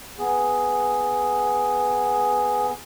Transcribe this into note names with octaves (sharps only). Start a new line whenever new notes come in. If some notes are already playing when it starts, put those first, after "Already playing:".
B3 G#4